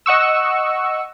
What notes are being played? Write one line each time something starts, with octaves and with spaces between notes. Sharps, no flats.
D#5 F#5 C#6 E6